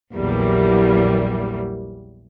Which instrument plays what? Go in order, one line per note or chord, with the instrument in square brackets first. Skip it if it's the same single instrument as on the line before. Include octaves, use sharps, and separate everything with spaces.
[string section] A#1 E2 E3 F#3 G3 A#3